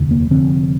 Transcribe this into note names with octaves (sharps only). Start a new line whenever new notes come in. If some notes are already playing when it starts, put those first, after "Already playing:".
Already playing: F1 D#2 D3
A#3
F1 F2 D3 C4